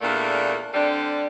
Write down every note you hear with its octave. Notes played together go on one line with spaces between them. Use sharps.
E2 A#2 A3 A#3 D4
D3 G3 C4 D4